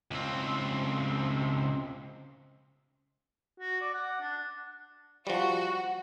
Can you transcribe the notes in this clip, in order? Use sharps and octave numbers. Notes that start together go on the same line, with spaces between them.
C#2 C4
F#4
D5
F#5
D4
F3 G3 F#4